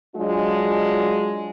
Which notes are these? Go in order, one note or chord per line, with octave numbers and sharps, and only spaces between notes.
F#3 G#3 D4 F4